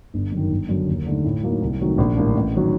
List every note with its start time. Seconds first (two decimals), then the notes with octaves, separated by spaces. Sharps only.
0.14 G1
0.32 F#2
0.37 D#3
0.50 G1
0.69 F#2 D3 F#3
0.88 D#2
1.06 D3 A3 D#4
1.25 A2
1.43 F#3 A#3 D#4
1.62 C2
1.80 C3 D#3 F#3 A3
1.98 A#1
2.16 A2 G3 A#3 D4
2.35 A1
2.55 D#3 F#3